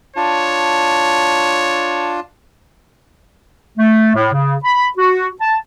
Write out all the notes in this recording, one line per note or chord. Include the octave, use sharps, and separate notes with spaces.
D4 F4 C#5 A5
A3
A2
C#3
B5
F#4
A5